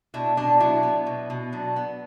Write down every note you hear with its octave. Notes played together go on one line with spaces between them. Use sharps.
B2 D4 E4
B2 D4
F#3 D4 E4
B3
B2
B2
F#3 D4
B3